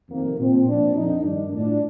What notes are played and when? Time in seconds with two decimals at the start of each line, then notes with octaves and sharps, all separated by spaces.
0.10 F2 C3 D#3 A#3
0.38 A#2 F3 C4
0.67 A#2 F3 D4
0.95 F2 D3 F3 D#4
1.23 G2 D#3 D4
1.52 A2 F3 D4